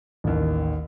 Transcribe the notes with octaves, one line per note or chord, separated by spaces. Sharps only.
A1 D#2